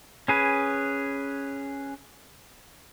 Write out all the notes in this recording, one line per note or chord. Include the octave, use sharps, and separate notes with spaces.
C#4 G#4 B4